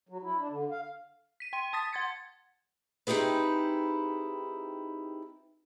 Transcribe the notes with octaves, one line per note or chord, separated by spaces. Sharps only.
F#3
E4
D4
D3
F5
B6 D#7
G5 C6 D#7
A5 D#6 A6 B6
F#5 C6 G#6 A6 C#7
C4 D#4 E4 G4 G#4 B4